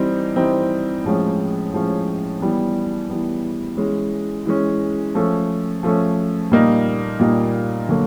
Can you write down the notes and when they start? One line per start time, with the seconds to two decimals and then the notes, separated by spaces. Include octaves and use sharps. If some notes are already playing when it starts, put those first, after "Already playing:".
Already playing: E3 G3 C4 D#4
0.36 E3 G3 C4 D#4
1.04 A2 F3 G#3 C#4
1.72 A2 F3 G#3 C#4
2.41 E3 G3 B3
3.09 E3 G3 B3
3.77 E3 G#3 C#4
4.46 E3 G#3 C#4
5.15 F3 A3 C#4
5.83 F3 A3 C#4
6.51 A#2 G3 A#3 D#4
7.19 A#2 G3 A#3 D#4
7.89 D3 F#3 A#3